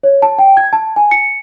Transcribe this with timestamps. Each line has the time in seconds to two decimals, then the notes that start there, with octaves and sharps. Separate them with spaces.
0.03 C#5
0.22 A5
0.39 G5
0.57 G#6
0.73 A5
0.96 G#5
1.11 C#7